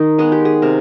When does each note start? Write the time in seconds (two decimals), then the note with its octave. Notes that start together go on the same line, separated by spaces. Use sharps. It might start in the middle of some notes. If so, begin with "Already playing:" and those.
Already playing: D#3 D#4
0.18 G#3 B3 G#4
0.32 G4
0.45 G#4
0.62 C3 A#4